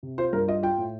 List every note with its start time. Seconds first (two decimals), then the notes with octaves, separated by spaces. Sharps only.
0.03 C3
0.18 F4 C5
0.33 G2 A#4
0.48 F4 D#5
0.63 F4 G5
0.78 A2